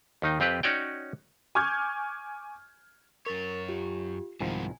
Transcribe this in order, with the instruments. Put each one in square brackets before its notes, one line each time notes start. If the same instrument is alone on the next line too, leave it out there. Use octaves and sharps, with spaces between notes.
[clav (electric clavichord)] D#2 D#3 D#4
F2 C4 F4 G4 B4
C#4 D#4 F#4 C#5 D5 G5
[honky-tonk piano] G#5 C#6 D6 F6 G6 G#6
[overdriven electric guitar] F#2 C#5 [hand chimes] A#4 A6
[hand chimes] F4 G4
[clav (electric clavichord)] C2 D#3 F3 [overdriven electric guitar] G#2 B3 [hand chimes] G#5